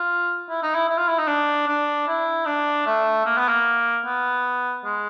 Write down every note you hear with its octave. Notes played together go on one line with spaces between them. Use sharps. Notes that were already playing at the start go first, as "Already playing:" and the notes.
Already playing: F4
E4
D#4
E4
E4
F4
E4
D#4
D4
D4
E4
D4
A3
A#3
B3
A#3
B3
G#3